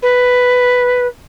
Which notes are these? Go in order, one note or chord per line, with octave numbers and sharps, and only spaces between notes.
B4